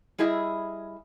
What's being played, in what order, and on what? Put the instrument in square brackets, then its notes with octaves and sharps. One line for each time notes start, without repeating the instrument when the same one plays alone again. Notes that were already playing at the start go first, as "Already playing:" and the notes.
[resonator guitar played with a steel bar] G3 E4 G#4 D#5 E5